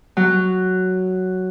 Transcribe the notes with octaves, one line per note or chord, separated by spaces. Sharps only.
F#3